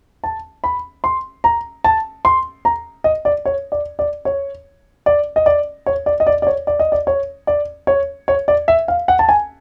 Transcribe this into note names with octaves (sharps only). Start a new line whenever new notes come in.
A5
B5
C6
A#5
A5
C6
A#5
D#5
D5
C#5
D5
D5
C#5
D5
D#5
D5
C#5
D5
D#5
D5
D5
C#5
D5
D#5
D5
C#5
D5
C#5
C#5
D5
E5
F5
F#5
A5
G#5